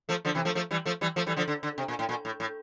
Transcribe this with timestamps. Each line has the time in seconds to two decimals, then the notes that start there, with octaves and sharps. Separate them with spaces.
0.09 F3 A3
0.25 D3 F3
0.35 C3 E3
0.45 F3 A3
0.55 F3 A3
0.71 E3 G3
0.85 F3 A3
1.01 E3 G3
1.16 F3 A3
1.26 E3 G3
1.36 D3 F3
1.48 D3
1.63 D3
1.78 C3
1.88 A#2
1.99 A2
2.09 A#2
2.25 A2
2.40 A2